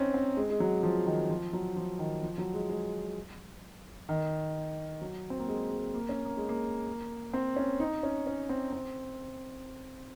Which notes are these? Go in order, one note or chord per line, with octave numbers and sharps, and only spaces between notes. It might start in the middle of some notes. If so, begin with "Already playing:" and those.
Already playing: C4 C#4 D#4
C4
G#3
G#3
F#3
F3
D#3
F3
F#3
F3
D#3
F3
F#3
G#3
G#3
D#3
F#3
C4
A#3
G#3
G#3
A#3
C#4
A#3
G#3
A#3
C4
C#4
D#4
C#4
C#4
C4
C4